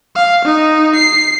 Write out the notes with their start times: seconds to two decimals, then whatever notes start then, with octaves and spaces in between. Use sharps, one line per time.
0.15 F5
0.45 D#4
0.95 C7